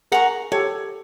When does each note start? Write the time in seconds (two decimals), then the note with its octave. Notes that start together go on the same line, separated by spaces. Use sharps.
0.12 G#4 A#4 F#5 A#5 C#6
0.52 G4 A4 C#5